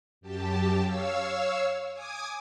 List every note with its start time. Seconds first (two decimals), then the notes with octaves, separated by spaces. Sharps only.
0.21 F#2 G4 A5
0.82 C#5 F5 E6
1.93 G#5 D6 D#6 G#6